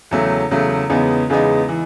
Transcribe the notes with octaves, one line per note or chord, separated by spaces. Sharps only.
E2 C#3 F#3 A3
E2 C#3 F#3 A3
E2 C#3 G#3 B3 D#4
E2 C#3 G#3 B3 D#4
E3